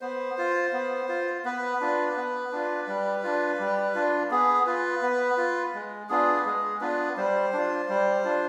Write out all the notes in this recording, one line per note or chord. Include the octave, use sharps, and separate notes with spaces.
B3 C5
F4
B3
F4
B3 B4
D4 F4
B3
D4 F4
G3
D4 F4
G3
D4 F4
B3 G#4
F4 B4
B3
F4
G#3
B3 D4 F4 G#4
B4
G#3 G#4
B3 D4 F4 B4
G3 C5
D4 F4
G3
D4 F4